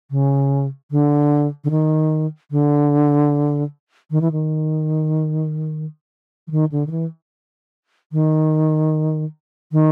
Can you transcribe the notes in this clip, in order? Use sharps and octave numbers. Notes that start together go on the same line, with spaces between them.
C#3
D3
D3
D#3
D3
D#3
E3
D#3
E3
D#3
D3
D#3
E3
D#3
D#3